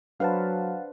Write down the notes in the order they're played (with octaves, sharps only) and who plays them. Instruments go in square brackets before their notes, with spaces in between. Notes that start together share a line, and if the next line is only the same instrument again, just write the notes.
[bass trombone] F#3 [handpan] D4 B4 C5 [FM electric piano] F5 F#5 A5